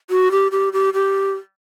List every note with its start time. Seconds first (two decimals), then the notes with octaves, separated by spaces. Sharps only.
0.10 F#4
0.31 G4
0.52 G4
0.73 G4
0.94 G4